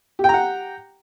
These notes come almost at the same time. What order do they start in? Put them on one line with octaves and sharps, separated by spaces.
G4 G5 A#5 F#5